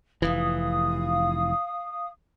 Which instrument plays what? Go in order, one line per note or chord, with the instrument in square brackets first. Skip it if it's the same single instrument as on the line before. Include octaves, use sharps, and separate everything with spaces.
[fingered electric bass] F1 B1 E3 [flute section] F5 D#6